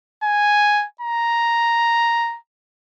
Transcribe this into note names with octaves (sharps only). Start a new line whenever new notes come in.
G#5
A#5